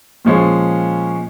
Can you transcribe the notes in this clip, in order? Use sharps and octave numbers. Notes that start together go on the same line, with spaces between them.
A#2 F3 G#3 C#4